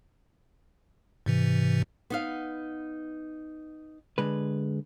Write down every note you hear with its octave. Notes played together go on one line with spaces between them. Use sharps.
G#2 C3 E3
B3 D#4 F5
D3 G#3 B4